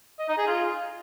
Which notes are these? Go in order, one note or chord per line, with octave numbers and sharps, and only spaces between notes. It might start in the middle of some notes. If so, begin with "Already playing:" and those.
D#5
D#4
G#4
F4